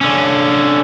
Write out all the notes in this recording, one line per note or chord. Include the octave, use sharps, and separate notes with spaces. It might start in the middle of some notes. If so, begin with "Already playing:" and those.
D3 C#4